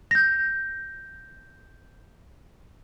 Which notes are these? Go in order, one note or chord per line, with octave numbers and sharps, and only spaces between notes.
G6 A#6